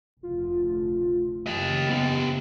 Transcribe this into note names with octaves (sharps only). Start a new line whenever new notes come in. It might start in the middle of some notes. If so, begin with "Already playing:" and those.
F1 D2 F4
F#2 C#3 E3 G4 D#5 A6
B3 G4